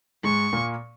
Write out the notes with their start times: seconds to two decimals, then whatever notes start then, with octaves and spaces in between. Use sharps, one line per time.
0.24 G#2 G#3 C#6
0.53 A#2 A#3